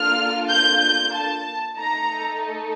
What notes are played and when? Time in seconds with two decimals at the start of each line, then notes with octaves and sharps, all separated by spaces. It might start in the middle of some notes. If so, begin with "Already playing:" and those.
Already playing: A#3 D4 F4 A4 F6
0.50 G6
0.81 G6
1.13 A5
1.77 A3 D#4 A4 A#5